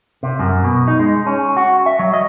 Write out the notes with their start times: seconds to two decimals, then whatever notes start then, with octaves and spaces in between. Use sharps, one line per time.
0.23 C3
0.39 F#2
0.64 B2
0.88 D#4
0.99 G#3
1.27 C#4
1.57 F#4
1.86 E5
1.99 F#3
2.13 D#5